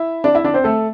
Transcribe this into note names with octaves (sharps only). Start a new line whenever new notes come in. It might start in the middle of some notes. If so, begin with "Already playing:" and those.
Already playing: E4 E5
D4 D5
E4 E5
D4 D5
C4 C5
A3 A4